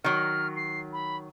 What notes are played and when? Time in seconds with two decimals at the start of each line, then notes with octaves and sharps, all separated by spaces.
0.04 D#3 F#3 F6
0.56 C7
0.93 B5